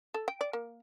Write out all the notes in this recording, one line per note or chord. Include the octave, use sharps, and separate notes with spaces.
A4
G5
D5
A#3